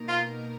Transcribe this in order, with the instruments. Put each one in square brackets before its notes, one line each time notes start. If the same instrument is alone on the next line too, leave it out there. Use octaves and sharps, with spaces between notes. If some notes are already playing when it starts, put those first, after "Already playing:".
Already playing: [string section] B2 A#3 D#4 A#4
[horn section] F4